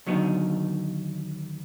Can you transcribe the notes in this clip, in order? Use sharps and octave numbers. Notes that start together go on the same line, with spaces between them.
D#2 D3 F#3 B3 D#4